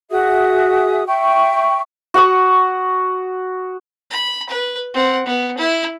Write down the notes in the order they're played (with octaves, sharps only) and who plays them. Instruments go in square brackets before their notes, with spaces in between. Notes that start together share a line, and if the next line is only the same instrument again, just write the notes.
[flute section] F#4 G#4 E5 D#6
E5 G5 C#6
[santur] F#4 F#5 C#6 D#6
[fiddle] B5
B4
C4 F#5
B3
E4